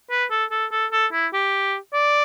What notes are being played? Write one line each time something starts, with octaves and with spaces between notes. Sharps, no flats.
B4
A4
A4
A4
A4
E4
G4
D5